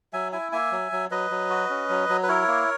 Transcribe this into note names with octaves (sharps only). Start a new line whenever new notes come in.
F#3 E5 G#5
E4 E5 G#5
A#3 E5 G#5
F#3
F#3
F#3 B4 D#5
F#3
F#4
C#4
F#3
F#3
B4
E4 A#4 C#5
A#3